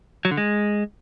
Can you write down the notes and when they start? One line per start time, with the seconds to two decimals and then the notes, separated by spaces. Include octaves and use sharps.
0.25 F#3
0.31 D3
0.37 G#3